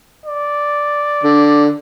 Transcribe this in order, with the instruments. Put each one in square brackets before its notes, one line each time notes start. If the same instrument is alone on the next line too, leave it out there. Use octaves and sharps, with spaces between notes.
[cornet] D5
[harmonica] D3